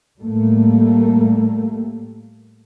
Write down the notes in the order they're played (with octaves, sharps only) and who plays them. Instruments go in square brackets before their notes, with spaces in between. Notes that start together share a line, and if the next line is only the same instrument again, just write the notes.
[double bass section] A2 G3 A3 A#3